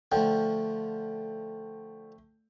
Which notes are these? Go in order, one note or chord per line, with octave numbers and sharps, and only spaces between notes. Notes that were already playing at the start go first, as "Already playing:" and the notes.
D3 F3 A3 G5